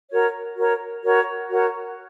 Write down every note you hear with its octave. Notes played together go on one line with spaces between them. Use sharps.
F#4 A#4 C#5
F#4 A#4 C#5
F#4 A#4 C#5
F#4 A#4 C#5